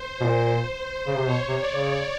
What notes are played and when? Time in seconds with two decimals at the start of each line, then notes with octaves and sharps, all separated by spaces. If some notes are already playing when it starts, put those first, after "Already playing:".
Already playing: C5
0.21 B2
0.25 A#2
1.07 C#3
1.17 C3
1.26 B2 C#5
1.48 C3
1.60 D5
1.71 C#3